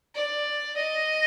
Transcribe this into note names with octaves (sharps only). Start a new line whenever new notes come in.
D5
D#5